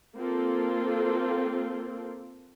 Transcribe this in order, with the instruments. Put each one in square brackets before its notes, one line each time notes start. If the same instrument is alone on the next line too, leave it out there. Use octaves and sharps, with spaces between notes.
[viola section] A#3 C4 F4 A4